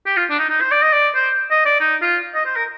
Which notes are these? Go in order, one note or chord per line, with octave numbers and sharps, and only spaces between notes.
G4
F4
D4
D#4
D#4
C5
D5
D#5
D5
C5
D#5
D5
D#4
F4
D#5
C5
A#4